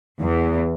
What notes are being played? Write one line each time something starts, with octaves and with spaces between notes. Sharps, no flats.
E2